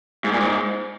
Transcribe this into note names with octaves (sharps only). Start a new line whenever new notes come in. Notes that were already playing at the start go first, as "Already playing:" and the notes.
G#2
A#2
G#2